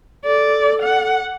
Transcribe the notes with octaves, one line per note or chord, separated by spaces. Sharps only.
A4 D5
F#5